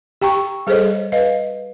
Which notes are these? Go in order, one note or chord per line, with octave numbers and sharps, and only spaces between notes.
G4 G5 A#5 C#6
G3 G#4 A4 C5 C#5 D#5
B4 D#5 F5